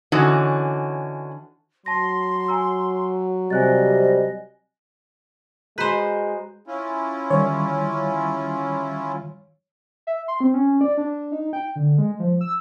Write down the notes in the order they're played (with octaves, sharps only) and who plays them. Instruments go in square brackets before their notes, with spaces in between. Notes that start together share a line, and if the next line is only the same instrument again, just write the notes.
[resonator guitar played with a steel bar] D3 E3 C#4 D#4 F#4
[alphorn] F#3 [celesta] A5 A#6 [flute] C6
[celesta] G#5 A#5 E6
[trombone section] C3 G3 [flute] D#5 [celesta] G#5 F#6 A6
[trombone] G#3 [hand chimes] F#4 A#5 G6 [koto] B4 C5
[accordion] C#4 E4 F4
[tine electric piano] D#3 G3 [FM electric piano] C#5
[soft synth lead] E5
C6
C4
C#4
D5
D4
D#4
G5
D3
G#3
F3
E6